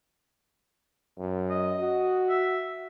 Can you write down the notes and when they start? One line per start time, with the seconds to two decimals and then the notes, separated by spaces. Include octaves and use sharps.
1.18 F#2
1.50 D#5
1.80 F#4
2.30 E5